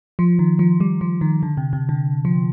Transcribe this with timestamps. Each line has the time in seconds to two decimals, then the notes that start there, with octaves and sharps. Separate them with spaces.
0.19 F3
0.39 D#3
0.59 F3
0.80 G3
1.01 F3
1.21 D#3
1.43 D3
1.57 C3
1.73 C3
1.89 D3
2.25 F3